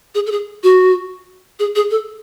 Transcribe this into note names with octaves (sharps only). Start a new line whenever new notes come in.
G#4
A4
G#4
F#4
G#4
G#4
A4